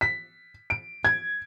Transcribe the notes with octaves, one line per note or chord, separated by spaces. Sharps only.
B6
D7
G#6